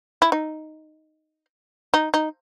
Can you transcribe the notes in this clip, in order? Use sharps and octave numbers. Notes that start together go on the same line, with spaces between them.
E4
D#4
D#4
D#4